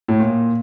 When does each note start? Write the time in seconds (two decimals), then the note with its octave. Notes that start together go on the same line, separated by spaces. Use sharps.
0.08 A2
0.20 A#2